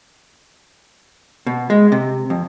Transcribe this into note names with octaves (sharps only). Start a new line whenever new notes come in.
B2
G#3
C3
F2